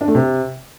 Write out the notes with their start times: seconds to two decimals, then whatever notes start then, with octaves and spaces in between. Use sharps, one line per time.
0.01 D4
0.08 A3
0.15 C3